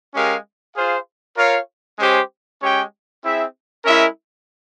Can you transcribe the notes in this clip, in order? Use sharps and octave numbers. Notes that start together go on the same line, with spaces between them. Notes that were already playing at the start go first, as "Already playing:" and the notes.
G#3 C#4 G4 A#4 F5
F4 G#4 C5 F5
F4 A#4 C#5 F5
G#3 C#4 G4 C5
G#3 C#4 G4 C#5 G5
C4 E4 G#4 E5
G#3 C#4 E4 A#4 E5